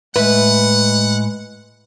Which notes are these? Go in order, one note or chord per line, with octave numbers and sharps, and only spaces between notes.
A2 G#3 B4 E5 F#5